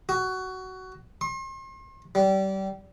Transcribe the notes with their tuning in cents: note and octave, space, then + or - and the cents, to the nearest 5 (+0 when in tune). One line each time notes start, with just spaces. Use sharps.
F#4 +15
C6 +40
G3 -25